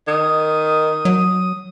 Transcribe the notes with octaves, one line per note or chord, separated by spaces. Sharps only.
D#3 D#6
F#3